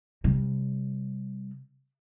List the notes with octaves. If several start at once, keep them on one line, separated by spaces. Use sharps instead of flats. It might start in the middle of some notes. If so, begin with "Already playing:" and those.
C3 G3